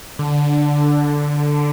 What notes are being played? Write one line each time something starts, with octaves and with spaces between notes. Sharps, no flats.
D3